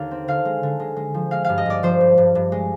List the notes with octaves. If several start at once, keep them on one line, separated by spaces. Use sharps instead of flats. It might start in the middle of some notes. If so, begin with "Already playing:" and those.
Already playing: D#2 D3 F5
C4
D3 F5
G#3
D3
G#3
G#3
F3
G#3 F5
G2 F5
D#5
G2 D5
F3 C5
G2
G2
G2
G#3